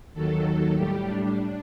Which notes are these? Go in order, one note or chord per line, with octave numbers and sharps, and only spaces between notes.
D#2 D#3 F#3 A4
A2 G3 G4
D4